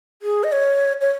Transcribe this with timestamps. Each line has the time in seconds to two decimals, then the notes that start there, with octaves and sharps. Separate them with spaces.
0.22 G#4
0.44 D#5
0.52 C#5
1.01 C#5